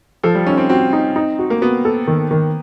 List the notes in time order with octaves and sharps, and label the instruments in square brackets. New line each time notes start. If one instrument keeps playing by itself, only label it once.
[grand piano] F3 [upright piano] A4
[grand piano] G3
[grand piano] C#4 [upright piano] D#4
[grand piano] C4
[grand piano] C4 [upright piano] F#4
[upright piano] D#4
D#4
F#4
[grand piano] A#3
[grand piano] B3 [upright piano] F#4
[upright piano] A4
D#3
D#3